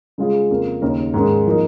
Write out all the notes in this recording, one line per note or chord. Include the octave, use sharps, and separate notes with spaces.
C#3 G#3 F4 G#4
F2 C#3 A#3 F4
D#2 C#3 A#3 D#4 A#4
G#2 D#3 G#3 C#4
F3 A#3 D#4